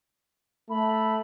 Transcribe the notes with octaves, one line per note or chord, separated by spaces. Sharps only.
A3 B5